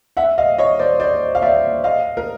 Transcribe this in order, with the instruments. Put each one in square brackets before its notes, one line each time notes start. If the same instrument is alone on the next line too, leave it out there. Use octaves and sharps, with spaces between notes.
[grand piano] E5 F#5
D#5 F5
C#5 D#5
C5 D5
C5 D5
F5
D5 E5
D#5 F5
A#4